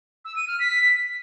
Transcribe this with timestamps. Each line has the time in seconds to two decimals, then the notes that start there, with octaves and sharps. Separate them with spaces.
0.25 E6
0.36 D#7
0.48 F6
0.59 B6